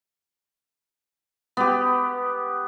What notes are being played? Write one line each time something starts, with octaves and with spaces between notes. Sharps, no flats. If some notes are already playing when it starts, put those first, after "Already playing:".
B3 G4